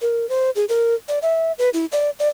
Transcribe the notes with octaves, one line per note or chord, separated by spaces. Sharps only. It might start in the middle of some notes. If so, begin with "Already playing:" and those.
A#4
C5
G#4
A#4
D5
E5
B4
E4
D5
D5